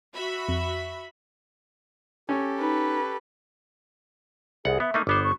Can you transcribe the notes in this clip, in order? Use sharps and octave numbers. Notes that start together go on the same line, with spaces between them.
F#4 E5 B5
F2
C#4 G4 A4
D#4 B4
C2 G#4 F#5
B3 E5
A3 A#3 D#4
G1 B3 C5 D6
C#6